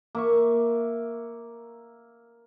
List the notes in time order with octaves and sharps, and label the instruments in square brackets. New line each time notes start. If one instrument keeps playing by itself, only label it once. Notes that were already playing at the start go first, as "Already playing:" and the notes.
[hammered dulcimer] A#3 E5 C#6